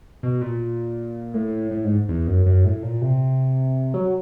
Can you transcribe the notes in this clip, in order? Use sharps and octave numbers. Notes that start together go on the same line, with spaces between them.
B2
A#2
A2
A2
G#2
E2
F#2
F#2
A2
A#2
C3
F#3